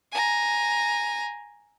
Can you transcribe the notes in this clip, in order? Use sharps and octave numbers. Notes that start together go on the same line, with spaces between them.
G#5 A#5